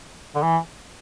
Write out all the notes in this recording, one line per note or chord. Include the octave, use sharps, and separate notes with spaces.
D3
E3